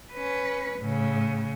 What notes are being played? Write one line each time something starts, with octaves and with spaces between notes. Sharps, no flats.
C#4 B4
A2 C#3